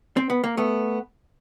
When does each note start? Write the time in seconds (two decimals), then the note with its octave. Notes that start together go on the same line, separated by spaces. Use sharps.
0.17 C4
0.30 B3
0.44 A#3
0.57 A3 B3